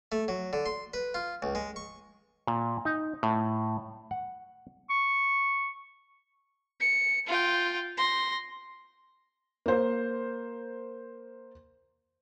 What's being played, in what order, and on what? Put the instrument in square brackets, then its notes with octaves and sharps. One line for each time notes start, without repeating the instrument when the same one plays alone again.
[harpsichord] A3
F#3
D3
C6
B4
F4
C#2
G#3
C#6
[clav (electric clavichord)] A#2
D#4
A2
F#5
[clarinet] C#6
[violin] C#7
F4 G5
C6 A#6
[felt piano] A#3 C5